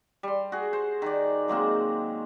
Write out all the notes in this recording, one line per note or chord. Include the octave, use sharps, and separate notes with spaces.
G3 C6
F#4 G#4
C5
D#3 D5
F#3 G#3 A#3 C4